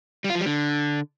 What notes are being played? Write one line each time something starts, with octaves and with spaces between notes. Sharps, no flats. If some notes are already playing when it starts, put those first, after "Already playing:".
G3
F4
F3
G3
D3